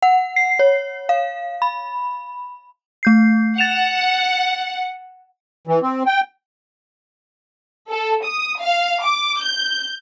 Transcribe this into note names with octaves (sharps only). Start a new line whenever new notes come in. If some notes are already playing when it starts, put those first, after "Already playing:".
F#5
C7
C#5
F5
B5
A3 G6 C7
F#5 A6 E7 F7
E3
C4
G5
A4
D#6
F5
D6
G6